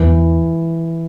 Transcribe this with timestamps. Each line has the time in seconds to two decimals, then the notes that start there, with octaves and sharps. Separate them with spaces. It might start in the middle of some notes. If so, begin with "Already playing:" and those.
Already playing: E2 E3